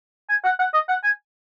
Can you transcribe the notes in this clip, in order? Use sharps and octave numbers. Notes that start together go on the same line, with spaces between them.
G#5
F#5
F#5
D#5
F#5
G#5